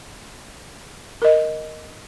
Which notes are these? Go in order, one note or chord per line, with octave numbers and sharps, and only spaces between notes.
A#4 D#5